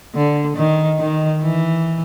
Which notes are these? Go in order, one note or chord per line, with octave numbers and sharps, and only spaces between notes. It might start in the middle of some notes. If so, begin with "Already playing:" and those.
D3
D#3
D#3
E3